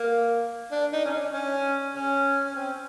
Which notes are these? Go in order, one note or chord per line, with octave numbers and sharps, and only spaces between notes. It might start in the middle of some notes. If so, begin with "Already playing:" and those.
Already playing: A#3
D4
D#4
C#4
D4
C#4
C#4
C#4
C4